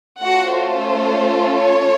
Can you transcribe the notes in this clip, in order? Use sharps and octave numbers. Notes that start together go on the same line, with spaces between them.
A3 C#4 F4 F#4 A4 F#5
C5
C#5